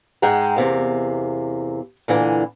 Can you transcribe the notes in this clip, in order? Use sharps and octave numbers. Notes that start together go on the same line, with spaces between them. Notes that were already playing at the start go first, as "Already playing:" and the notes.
G#2 G#3 F#5 G5 A#5
E2 C3 A#3
A#2 D3 E3